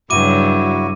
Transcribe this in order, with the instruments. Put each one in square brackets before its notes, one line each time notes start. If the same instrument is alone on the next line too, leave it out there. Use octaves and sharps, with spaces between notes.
[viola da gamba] G2 C#3 F#3 [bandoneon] E4 F#4 [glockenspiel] D6 D#7